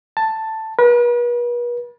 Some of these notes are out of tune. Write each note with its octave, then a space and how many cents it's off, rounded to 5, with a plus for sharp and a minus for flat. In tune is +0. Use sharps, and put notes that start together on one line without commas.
A5 +5
B4 -45